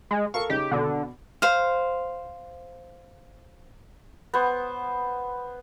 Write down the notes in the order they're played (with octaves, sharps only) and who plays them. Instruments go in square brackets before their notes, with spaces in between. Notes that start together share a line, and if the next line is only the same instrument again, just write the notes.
[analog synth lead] G#3
[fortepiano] A4 A#4 F5 [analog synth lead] C#6
[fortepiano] C#3 D#4 [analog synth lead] G4
[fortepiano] B2 F#4 D6 [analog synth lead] D3
[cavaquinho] C5 F5
[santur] B3 C5